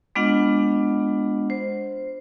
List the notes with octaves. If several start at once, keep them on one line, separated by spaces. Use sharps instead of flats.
G#3 B3 D4 F4 D#5 F#5
C5